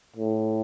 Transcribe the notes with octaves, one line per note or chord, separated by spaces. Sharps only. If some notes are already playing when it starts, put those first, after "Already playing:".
A2